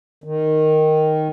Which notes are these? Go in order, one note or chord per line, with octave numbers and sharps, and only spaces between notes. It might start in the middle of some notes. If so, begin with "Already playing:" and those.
D#3